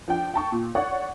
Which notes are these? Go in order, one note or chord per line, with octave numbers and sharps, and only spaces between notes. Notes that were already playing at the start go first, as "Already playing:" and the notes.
F3 D4 G5
G5 A5 C#6
A#2
C#5 D5 F#5 C#6